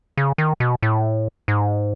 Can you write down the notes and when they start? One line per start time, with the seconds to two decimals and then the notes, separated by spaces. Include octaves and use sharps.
0.17 C#3
0.38 D#3
0.60 B2
0.83 A2
1.48 G#2